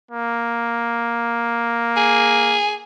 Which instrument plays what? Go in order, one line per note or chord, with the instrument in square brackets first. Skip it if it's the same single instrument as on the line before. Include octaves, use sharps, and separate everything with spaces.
[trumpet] A#3
[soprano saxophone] G#4